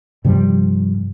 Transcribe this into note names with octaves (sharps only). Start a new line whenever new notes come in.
G2 C3 F3 G3